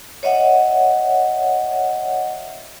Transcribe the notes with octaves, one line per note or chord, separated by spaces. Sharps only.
C#5 D#5 E5 F#5